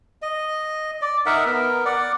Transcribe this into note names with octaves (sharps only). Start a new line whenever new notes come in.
D#5
D5
D#4 A#4 E5 F#5
B3 A#4
D5 F#5